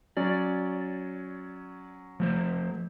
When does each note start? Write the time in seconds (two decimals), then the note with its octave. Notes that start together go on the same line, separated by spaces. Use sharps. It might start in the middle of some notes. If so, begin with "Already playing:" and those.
0.17 F#3 C#4 D5
2.20 F3 A3 C5